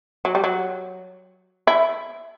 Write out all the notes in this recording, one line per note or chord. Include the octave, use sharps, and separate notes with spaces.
F#3
G3
F#3
E4